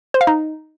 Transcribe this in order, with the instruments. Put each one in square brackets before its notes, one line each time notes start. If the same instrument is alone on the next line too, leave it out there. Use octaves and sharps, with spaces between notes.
[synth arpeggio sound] C5
F5
D#4